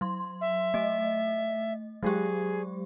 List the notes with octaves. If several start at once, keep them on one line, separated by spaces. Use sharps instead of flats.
F#3 C6
E5
A3 D#5
F#3 G#3 G4 G#4